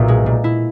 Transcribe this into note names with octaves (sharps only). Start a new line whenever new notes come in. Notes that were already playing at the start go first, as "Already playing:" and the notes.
Already playing: B1 A#2 E5
G#3
A#2
E4